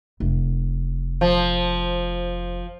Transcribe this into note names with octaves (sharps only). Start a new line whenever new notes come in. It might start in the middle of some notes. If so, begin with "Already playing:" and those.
F1
F3